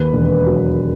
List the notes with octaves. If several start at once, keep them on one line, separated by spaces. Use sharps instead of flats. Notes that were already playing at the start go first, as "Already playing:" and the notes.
Already playing: D#2 B4
E1
F#3